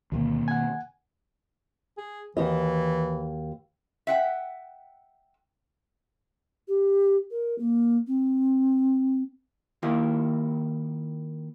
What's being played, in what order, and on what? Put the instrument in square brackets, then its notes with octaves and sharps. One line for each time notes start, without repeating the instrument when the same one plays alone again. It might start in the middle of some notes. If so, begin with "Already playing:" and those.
[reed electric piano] D2 [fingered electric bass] B2 D#3 A#3
[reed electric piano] F#5 G#5
[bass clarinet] G#4
[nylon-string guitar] D#2 F#4 D#5 [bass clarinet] E3
[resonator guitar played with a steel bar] E5 F#5 G5
[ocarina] G4
A#4
A#3
C4
[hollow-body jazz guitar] D#3 A#3 E4 F#4 D#5